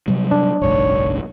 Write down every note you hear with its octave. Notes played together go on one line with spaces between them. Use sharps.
C3 F#3 G3
D4
F#1 B1 G#2 C#5